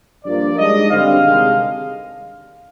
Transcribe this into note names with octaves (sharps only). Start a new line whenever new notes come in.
G2 F3 A#3 D5
G#2 G3 D4 D#5
D3 G3 C4 F5
C3 D#3 G#3 D4